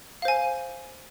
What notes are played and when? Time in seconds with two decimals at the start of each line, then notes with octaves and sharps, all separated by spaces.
0.22 F5
0.25 C5
0.28 G#5